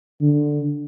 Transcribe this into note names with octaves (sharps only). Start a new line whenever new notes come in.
D3